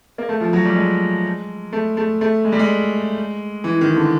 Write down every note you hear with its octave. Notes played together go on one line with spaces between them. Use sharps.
A#3
A3
F3
F#3
G3
G#3
A3
A3
A3
G#3
G3
G#3
E3
D#3
D3